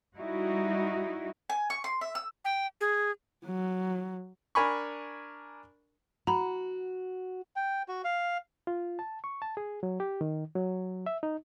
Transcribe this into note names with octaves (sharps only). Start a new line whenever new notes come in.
G3 D#4 E4 F#4
G#5
C#6
C6
E5
E6
G5
G#4
F#3
D4 A#4 G#5 B5 C#6
F#4 A#5 B5
G5
F#4
F5
F4
A5
C#6
A5
G#4
F#3
G4
D#3
F#3
E5
D#4